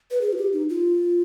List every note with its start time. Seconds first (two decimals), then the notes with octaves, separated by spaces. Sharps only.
0.11 B4
0.21 G#4
0.33 F4
0.37 G4
0.53 D#4
0.69 F4